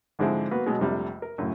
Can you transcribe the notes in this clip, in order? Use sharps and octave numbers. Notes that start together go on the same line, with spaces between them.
G#2 D3 F3 G#3 C4 E4
A#3 B3 F#4 B4
B2 F#3 G#3
A#1 F2 C3 G3 A3
A#4
F#2 A2 C#3